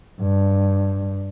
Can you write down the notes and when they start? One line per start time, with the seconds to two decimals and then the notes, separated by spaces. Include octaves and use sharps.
0.21 G2